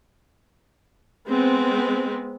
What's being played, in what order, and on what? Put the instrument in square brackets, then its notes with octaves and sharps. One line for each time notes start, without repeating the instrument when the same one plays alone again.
[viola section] G#3 B3 C4